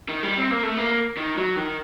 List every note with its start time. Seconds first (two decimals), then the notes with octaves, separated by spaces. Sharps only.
0.08 D#3
0.23 G3
0.38 C4
0.50 A#3
0.63 A3
0.77 A#3
1.17 D#3
1.37 F#3
1.56 D#3